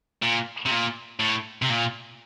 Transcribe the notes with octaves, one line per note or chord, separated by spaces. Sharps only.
A#2
C3
A#2
A2
C3
A#2